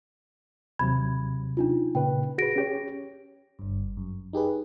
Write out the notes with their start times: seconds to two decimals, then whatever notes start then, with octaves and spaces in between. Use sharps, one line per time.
0.79 D#2 C3 F#3 B5 G#6
1.57 D4 D#4 F4
1.95 A#2 C#3 B4 G5
2.38 F#4 G#4 B4 A#6 D7
2.56 C#4 G4 C#5
3.59 G1 G2
3.97 F#2
4.33 D#4 G4 G#4 B4